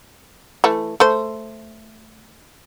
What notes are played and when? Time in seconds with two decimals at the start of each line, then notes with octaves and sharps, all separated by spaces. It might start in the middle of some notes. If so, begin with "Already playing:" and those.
0.64 E3 A3
1.00 A3 C5